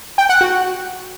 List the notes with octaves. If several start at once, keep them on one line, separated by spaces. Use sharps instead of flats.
G5
F#5
F#4